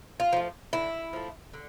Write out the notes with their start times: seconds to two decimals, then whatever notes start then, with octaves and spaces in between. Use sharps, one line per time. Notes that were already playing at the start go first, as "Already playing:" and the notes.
0.20 F4
0.33 F3 A3
0.73 D3 E4
1.13 F3 A3
1.54 D3